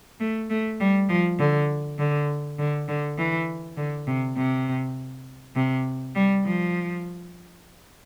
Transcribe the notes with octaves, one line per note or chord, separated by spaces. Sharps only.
A3
A3
G3
F3
D3
D3
D3
D3
E3
D3
C3
C3
C3
G3
F3